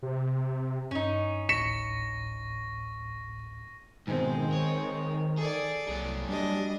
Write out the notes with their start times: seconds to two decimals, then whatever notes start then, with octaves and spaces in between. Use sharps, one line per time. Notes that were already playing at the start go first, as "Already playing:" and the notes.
0.03 C3
0.91 G2 C#4 D#4
1.49 G#1 D2 A2 C#6 A#6 B6 C#7 E7
4.07 G#2 B2 D#3 G#3 C4
4.53 C#5
5.38 G#4 A4 D5
5.89 C2 F#3 G#4
6.28 G3 D4 D#5